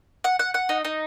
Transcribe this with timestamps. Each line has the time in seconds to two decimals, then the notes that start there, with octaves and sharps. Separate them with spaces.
0.24 F#5
0.39 F#5
0.54 F#5
0.69 D#4
0.85 D#4